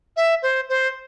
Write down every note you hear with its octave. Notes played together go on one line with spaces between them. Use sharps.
E5
C5
C5